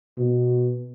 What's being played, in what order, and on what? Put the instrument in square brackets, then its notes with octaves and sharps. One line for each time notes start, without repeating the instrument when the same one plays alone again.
[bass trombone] B2